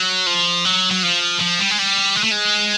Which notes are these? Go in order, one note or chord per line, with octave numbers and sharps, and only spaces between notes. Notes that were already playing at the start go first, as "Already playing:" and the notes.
Already playing: F#3
F3
F#3
F#3
F3
F3
G3
G#3
G3
G#3
A3
G#3